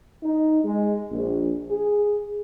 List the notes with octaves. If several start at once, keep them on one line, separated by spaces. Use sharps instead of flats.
D#4
G#3
A#1
G#4